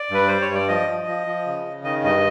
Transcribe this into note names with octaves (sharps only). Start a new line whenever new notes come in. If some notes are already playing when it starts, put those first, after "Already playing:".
Already playing: D5
G2 B4
G3 C5
C#5
G2
D5
F3 D#5
F3
F3
F3
C#3
C#3
D#3 D#5
G2 D#5